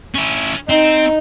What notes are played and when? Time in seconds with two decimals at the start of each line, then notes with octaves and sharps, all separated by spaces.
0.15 C#4 E4
0.69 C4 D#4